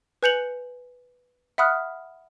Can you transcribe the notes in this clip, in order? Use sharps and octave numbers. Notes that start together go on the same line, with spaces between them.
B4 G#5 G6 C#7 F7 F#7
E5 F#5 B5 D#6 F6 F#6